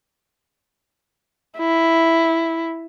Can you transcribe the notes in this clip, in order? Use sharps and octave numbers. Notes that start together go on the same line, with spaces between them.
E4